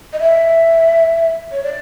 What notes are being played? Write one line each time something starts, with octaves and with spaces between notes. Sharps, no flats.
D#5
E5
C#5
D5